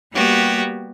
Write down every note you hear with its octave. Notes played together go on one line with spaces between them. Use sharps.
G3 A#3 B3 F#4 G4